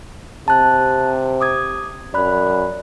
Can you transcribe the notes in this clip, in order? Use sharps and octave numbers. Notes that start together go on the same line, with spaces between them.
C3 A5 F#6
D6 D#6 G#6
F#2 D5 B5 F#6